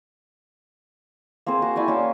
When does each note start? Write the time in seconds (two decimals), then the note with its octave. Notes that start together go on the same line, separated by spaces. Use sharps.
1.46 A#3 C4 G#4 C5
1.62 F#4
1.76 E4 D5 G5 G#5
1.88 A#3 C#4 C#5 F5